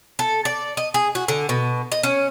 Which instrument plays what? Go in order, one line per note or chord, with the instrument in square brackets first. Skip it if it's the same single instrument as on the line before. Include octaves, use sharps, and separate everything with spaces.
[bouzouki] A4
D5
D#5
G#4
F#4
D3
B2
D#5
C#4